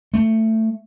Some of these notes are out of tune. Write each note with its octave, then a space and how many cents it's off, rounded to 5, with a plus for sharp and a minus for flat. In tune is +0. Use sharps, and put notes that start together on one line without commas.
A3 +15